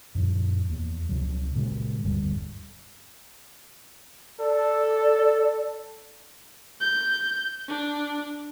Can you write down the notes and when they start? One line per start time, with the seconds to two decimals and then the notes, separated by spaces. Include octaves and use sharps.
0.15 F#2 A#2 F3
0.70 E2 A#3
1.09 C#2 C3 F3 F#3
1.55 A#2 C#3 E3 G#3
2.03 E1 D2 G2 G3
4.40 A4 D5
6.81 G6
7.68 D4